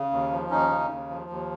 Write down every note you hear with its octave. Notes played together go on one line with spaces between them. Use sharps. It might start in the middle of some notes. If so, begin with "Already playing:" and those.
Already playing: C#3
D#2
F3
D#2 C#4 D#4
C#3
D#2
F3
D#2